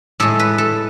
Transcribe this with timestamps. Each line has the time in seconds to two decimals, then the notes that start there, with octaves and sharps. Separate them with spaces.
0.20 A2 G#3 A4
0.39 B4
0.58 A4